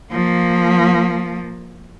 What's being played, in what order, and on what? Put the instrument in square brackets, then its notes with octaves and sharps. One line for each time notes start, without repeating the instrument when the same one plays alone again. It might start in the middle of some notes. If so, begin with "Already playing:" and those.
[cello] F3 A#3